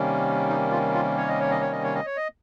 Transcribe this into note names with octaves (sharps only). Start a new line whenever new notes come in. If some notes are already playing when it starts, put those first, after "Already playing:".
Already playing: C3 D#3 G3 A#3 C#4
D#4
F4
F4
C#5
D#5
C#5
D#5
C#5
D#5
C#5
D#5
C#5
D#5